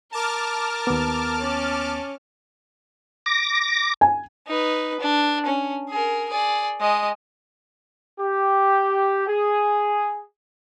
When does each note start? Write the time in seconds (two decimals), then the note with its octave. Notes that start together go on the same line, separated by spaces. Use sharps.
0.12 A#4 A5 D6 F6
0.87 D#2 B3
1.39 C#4
3.26 D6 A#6
4.01 G#5
4.47 D#4 B4
5.00 D4
5.46 C#4
5.89 G#4 A#4
6.30 G#4 D5
6.81 G#3 D#5
8.19 G4
9.28 G#4